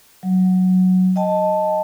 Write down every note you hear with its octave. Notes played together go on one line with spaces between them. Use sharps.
F#3
D#5 G5 A5